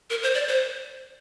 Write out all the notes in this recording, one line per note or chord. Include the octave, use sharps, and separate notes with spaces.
A#4
C5
D5
C5